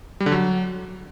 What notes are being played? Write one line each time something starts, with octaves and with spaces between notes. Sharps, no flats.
G3
D3
F#3